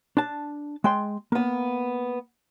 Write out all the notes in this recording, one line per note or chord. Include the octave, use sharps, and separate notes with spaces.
D4 A5
G#3 G5 C6
A#3 B3